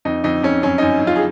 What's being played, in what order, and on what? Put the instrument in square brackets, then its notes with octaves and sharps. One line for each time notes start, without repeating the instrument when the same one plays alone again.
[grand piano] F2 D#4
F2 D#4
F2 C#4
F#2 C#4
F#2 D#4
F#2
F4
G#4